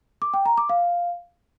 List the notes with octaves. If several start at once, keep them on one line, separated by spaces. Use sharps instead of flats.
D6
G5
A#5
D6
F5